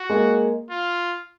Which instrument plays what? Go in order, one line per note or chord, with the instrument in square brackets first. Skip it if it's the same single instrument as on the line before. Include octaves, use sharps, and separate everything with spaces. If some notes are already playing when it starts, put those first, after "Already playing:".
Already playing: [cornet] F#4
[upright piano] G#3 A#3
[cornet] F4